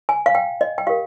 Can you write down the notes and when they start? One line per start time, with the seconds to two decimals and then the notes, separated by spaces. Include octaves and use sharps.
0.09 G#5
0.26 F5
0.35 G5
0.61 D#5
0.78 G5
0.87 G4 A#4 F5